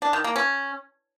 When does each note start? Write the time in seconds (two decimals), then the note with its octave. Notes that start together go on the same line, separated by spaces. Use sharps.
0.02 D4
0.13 D#3
0.24 A#3
0.36 C#4